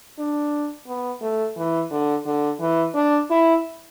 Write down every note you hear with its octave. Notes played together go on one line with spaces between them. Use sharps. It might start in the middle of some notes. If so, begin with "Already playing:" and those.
D4
B3
A3
E3
D3
D3
E3
D4
E4